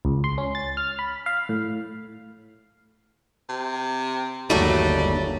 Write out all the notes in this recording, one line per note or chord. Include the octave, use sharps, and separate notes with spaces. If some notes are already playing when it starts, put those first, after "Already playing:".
C#2
C6
C#4
A6
F6
B5
F5
A2
C3
G1 D#2 F#3 G3 A3